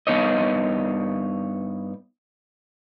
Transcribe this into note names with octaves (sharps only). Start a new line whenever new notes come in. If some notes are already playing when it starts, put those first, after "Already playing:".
G2 B3 D#4 C#5 D#5